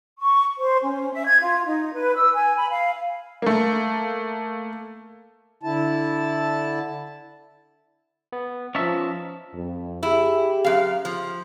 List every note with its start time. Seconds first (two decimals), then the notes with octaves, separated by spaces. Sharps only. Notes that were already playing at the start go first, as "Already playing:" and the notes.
0.20 C#6
0.57 C5
0.82 C#4
1.14 E5
1.26 G#6
1.41 F4
1.66 D#4
1.95 B4
2.16 E6
2.35 G#5
2.56 B5
2.70 F5
3.42 A3 A#3
5.63 D3 E4 A5
8.32 B3
8.75 F3 C#4 D#4 E5 A5
9.54 F2
10.03 E4 G4 G#4
10.64 F#2 F5
11.05 F3